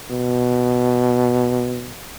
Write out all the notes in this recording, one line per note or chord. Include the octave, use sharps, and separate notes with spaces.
B2